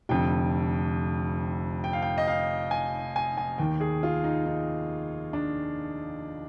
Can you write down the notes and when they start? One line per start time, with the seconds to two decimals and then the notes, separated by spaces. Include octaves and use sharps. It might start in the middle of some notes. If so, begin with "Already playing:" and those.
0.09 F1 F2 D3 G5
1.84 G5
1.93 F5
2.02 G5
2.18 D#5
2.28 F5
2.71 G#5
3.16 G#5
3.37 G#5
3.58 D#2 D#3 G5
3.81 G#4
4.03 F4
4.24 D#4
4.46 D#4
5.33 D4